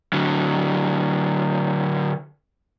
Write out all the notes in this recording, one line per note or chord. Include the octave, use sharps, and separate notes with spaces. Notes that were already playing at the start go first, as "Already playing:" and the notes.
D3 F#3